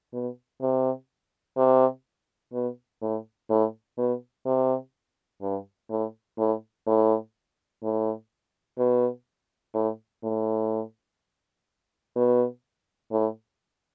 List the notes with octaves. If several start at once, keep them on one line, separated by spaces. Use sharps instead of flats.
B2
C3
C3
B2
A2
A2
B2
C3
G2
A2
A2
A2
A2
B2
A2
A2
B2
A2